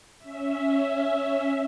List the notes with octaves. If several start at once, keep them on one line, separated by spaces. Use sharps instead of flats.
C#4 E5